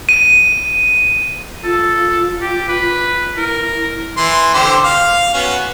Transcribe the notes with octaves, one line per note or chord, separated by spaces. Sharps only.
D#7
F4 A4
G4
B4
E4 A#4
E3 C6
D3 G4 C5
F5
B3 C#4 F#4